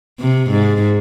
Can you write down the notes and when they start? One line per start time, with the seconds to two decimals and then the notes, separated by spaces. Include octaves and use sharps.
0.20 C3
0.50 G#2